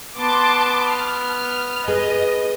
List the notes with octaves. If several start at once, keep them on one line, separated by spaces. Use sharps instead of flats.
B3 A5 C6 D6
F6
G#4 B4 D#5